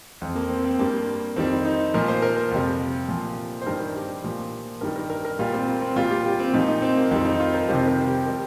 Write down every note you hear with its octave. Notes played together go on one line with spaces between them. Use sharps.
F2 F3 C4
A#3
C4
C4
G2 G3 A#3
F2 D#3 G3 C4
D#4
A#2 F3 A#4
C5
A#4
A#4
F2 C3 G3
A#2 F3
C5
G2 D#3 G3 A#4
G4
A#2 F3
G2 D#3 G3 A#4
A#4
A#4
A#4
A#2 G3 F4
C4
A#3
C4
A#2 G3 F4
G4
G4
C4
A#2 F3 D#4
D#4
C4
A#3
F2 D#3 G3 C4
D#4
F4
A#4
F2 C3 D#3 G3 C5
A#4
G4
G3 A#4